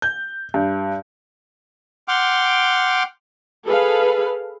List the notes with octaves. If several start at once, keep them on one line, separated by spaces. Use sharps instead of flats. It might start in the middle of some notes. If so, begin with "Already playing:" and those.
G6
G2
F#5 G5 C6 D6 F6
G#4 A4 B4 F5